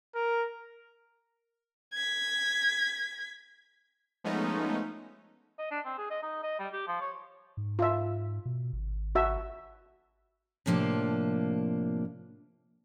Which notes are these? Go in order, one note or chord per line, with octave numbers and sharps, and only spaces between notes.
A#4
G#6 B6
F3 G#3 A3 B3 C#4 D#4
D#5
D4
C4
G#4
D#5
D#4
D#5
G3
G4
F3
C#5
G#2
F4 E5
B2
G#1
F#4 E5
A2 C3 F3 A#3 D4